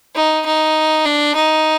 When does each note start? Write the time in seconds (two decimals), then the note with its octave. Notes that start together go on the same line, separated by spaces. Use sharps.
0.16 D#4
0.46 D#4
1.05 D4
1.36 D#4